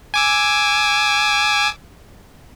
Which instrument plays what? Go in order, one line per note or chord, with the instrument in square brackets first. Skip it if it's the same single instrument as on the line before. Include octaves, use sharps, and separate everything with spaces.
[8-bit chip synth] G#5 D6 E6